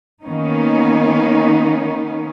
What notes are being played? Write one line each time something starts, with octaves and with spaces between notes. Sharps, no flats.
D#3 A#3 B3 C#4 D#4